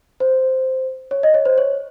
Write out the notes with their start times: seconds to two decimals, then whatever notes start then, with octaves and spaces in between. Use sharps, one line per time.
0.20 C5
1.11 C#5
1.23 D#5
1.34 C#5
1.45 C5
1.58 C#5